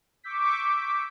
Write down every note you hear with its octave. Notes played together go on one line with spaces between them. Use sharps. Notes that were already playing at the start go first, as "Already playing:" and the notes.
C#6 D6 E6 G6 B6